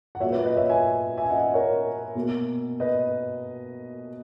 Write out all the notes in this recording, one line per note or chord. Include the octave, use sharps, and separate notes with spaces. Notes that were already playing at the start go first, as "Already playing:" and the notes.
F#5
A#2 F#3 A#3 C#5 E5
B4
B4 D#5
C#5 E5
E5 G#5
E5 G#5
D#5 F#5
A#4 C#5
B2 A#3
B4 D#5